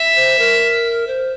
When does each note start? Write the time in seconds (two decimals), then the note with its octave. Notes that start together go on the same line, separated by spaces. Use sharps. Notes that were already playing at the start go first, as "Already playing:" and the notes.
Already playing: E5
0.16 C5
0.39 A#4
1.07 C5